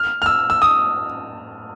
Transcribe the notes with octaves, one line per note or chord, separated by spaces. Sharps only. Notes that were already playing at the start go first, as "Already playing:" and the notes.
Already playing: F6
F6
E6
E6
D#6